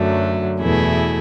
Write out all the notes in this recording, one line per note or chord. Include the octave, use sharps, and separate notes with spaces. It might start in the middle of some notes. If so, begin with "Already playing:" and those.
Already playing: F#2 D3 F#3 A3
E2 B2 A3 E4 G#4